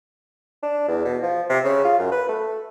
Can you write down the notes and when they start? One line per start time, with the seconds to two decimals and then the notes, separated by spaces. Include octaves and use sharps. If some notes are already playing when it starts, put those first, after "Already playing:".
0.63 D4
0.88 E2
1.05 B2
1.22 F3
1.50 C3
1.64 C#3
1.84 F4
1.99 F#2
2.12 B4
2.29 A3